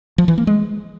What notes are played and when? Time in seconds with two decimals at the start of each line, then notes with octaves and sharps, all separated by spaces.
0.18 F3
0.28 E3
0.38 A#3
0.47 G#3